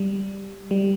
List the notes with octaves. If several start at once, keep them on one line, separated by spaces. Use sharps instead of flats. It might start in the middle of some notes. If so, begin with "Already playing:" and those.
Already playing: G3
G3